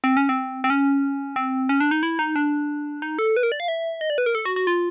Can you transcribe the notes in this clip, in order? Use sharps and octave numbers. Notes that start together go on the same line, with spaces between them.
C4
C#4
C4
C4
C#4
C4
C#4
D4
D#4
E4
D#4
D4
D#4
A4
B4
A#4
D5
F5
E5
D#5
D5
B4
A#4
A4
F#4
F#4
F4